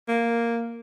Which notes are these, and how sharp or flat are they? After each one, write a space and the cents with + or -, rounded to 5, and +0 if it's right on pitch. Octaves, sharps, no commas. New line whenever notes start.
A#3 +0